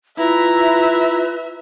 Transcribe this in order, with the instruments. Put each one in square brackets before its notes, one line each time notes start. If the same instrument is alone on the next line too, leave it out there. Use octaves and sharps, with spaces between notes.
[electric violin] E4 A#5 [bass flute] F4 [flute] B4 [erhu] E5